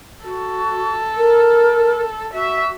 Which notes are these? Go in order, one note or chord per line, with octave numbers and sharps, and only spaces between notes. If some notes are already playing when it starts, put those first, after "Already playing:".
F#4 A4
A#4
F#4 E5